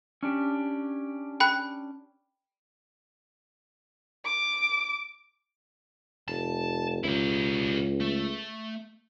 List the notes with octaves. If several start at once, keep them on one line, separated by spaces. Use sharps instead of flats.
C#4 D4 G4
G5 B5 F#6
D6
F1 A5
C#2 E4 G4
A3